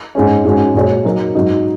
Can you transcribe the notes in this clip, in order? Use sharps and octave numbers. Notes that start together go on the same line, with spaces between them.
G#2 G#3 C#4
G#2 G#3 C#4 F#4
A#2 G#3 F#4 C#5
F#3 D#4 A#4
G#2 F#3 D#4